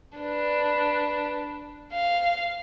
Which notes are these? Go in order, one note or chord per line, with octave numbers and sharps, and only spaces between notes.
D4 B4
F5